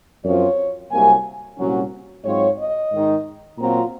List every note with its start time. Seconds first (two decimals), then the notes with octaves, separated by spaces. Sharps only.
0.24 F#2 F3 C4 F4 C#5
0.91 C2 C3 F#3 A#3 G#5
1.58 C2 A#2 F#3 C#4
2.25 G#2 F#3 C4 F4 C#5
2.58 D#5
2.92 G#2 D#3 G#3 D#4
3.58 A#2 F#3 C4 F4 A#5